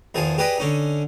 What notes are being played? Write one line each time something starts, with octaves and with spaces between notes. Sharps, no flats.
E2 D#3 F3 G#4 A5
G4 G#4 B4 D5 D#5
D3 C#4 D#4